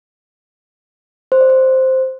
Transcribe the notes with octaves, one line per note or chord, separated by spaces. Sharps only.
C5
D5
C5